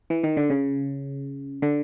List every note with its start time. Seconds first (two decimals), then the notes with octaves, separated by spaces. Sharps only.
0.10 E3
0.23 D#3
0.37 D3
0.50 C#3
1.62 D3